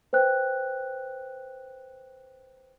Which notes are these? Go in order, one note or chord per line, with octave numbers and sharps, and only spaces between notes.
B4 C5 G5 F#6